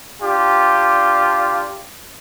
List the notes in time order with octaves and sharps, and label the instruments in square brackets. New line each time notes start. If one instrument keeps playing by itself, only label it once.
[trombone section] D4 F4 G4